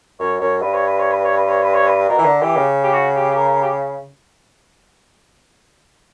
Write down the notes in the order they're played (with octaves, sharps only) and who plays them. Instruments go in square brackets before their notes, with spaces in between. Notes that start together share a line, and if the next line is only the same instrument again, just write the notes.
[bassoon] F#2 [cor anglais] C#5
[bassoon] F#2 [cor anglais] C#5
[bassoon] G2 [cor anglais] B4
[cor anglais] C#5
B4
C#5
B4
C#5
B4
C#5
B4
C#5
B4
[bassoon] B2 [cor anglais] A#4
[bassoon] E3
D3
[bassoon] E3 [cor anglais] G4
[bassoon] C#3
[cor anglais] G4
F#4
G4
G4
A#4
G4